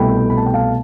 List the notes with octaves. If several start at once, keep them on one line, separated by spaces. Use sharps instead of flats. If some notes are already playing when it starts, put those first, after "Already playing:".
Already playing: C2 B2 A3 G5 B5
B5
A5
G5
F5 A5